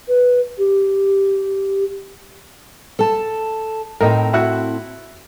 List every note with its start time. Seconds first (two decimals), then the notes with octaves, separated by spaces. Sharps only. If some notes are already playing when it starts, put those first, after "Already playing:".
0.08 B4
0.57 G4
2.99 A4 A5
4.01 A2 C4 D#4 A#4
4.33 E4 F#4 F#6